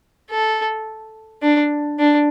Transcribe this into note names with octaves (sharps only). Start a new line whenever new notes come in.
A4
D4
D4